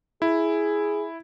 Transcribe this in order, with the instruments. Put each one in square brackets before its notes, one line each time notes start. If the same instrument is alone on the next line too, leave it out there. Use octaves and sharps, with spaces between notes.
[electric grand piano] E4 [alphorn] G#4